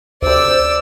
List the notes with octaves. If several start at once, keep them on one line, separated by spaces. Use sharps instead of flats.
D2 C3 C5 D5 E6